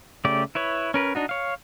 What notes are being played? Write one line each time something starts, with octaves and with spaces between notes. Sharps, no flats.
C#3 A3 G4 D5
E4 B4 C#5
C#4 A#4 B4
D4 D#4 F#4
C#5 F5